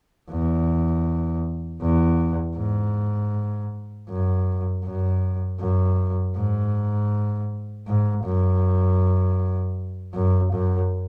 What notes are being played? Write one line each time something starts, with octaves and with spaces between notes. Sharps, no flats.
E2
E2
G#2
F#2
F#2
F#2
G#2
G#2
F#2
F#2
F#2